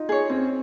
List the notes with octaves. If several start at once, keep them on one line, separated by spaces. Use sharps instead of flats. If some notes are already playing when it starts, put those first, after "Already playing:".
Already playing: D#4 F4
G#4 C#5
C4 C#4